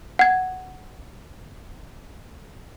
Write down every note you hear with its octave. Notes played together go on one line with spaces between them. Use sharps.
F#5 G#6